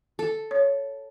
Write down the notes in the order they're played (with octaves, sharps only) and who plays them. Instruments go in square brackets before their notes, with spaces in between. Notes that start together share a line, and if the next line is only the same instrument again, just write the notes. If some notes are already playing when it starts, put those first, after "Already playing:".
[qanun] A4
[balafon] C#5